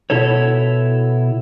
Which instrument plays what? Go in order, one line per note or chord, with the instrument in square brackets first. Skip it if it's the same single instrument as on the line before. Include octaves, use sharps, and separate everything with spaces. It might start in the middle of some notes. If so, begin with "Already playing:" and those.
[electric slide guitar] B2 E4 A4 C#5